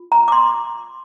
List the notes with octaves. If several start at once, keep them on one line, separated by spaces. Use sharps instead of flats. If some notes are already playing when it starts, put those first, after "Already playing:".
Already playing: F4
A#5
D6
C6